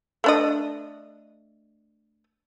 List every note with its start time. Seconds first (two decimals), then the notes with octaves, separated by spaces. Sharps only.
0.24 A3 D4 D#5